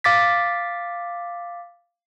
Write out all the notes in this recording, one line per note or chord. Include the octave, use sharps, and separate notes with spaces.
F5 D6 A6 B6